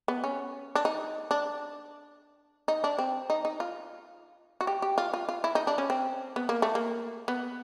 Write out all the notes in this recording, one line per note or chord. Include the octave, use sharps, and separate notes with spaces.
B3
C#4
D4
D#4
D4
D#4
D4
C4
D#4
D#4
F4
F#4
G4
G4
F4
F4
F4
E4
D#4
D4
C#4
C4
B3
A#3
A3
A#3
B3